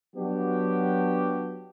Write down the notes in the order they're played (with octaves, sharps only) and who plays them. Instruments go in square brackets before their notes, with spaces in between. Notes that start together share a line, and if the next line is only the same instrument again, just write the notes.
[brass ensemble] F#3 B3 D4 F#4 G4